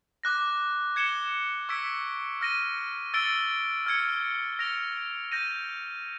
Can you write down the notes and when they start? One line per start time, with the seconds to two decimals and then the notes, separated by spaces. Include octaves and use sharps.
0.24 D6 F#6 A#6
0.96 G#6 C#7 E7 G7
1.69 C#6 E6 G#6 B6 D7
2.41 F6 A#6 D#7
3.14 E6 A6 D7 G7
3.86 F6 G#6 C#7
4.59 F6 A#6 D7 F7
5.32 G6 A#6 D#7